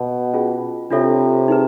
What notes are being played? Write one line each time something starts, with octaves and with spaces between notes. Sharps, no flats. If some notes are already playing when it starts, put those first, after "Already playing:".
Already playing: B2
C#4 F4 G#4
C3 D4 F4 A4 C#5 E5
D#4 G#4 B4